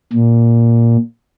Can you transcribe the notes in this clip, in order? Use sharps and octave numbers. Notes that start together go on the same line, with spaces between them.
A#2